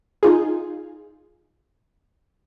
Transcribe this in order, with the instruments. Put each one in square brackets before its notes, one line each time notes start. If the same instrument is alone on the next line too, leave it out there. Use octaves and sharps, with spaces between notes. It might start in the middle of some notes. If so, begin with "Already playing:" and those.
[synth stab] D#4 F4 G#4